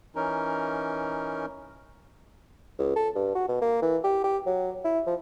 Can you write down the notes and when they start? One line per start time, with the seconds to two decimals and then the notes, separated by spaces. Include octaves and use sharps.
0.15 E3 C#4 D#4 A#4
2.79 C#2
2.96 A4
3.16 G2
3.35 F#4
3.48 B2
3.62 A#3
3.82 E3
4.04 G4
4.24 G4
4.46 F#3
4.85 E4
5.06 F3